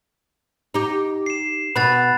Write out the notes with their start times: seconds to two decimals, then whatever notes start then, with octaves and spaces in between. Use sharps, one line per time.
0.74 D#4 G4
1.26 C7 E7
1.76 B2 B4 B5 F#6 A6